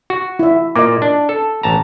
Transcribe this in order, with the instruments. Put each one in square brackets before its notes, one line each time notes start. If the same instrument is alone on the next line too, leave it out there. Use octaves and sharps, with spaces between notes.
[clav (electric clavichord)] F#4
[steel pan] E4 E5
[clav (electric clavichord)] A#2 A#3 [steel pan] D#5 D6
[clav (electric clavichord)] D4
A4
A1 A5 A#5